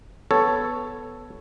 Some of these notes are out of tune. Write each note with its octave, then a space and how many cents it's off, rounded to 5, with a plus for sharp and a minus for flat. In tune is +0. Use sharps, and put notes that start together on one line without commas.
B3 +0 A4 +0 C#5 +0